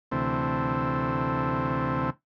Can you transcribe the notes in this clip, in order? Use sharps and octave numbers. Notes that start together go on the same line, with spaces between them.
D2 C3 E3 A3 C4